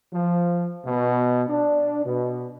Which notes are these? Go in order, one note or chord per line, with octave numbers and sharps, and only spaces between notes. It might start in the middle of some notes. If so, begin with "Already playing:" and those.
F3
B2
D4
B2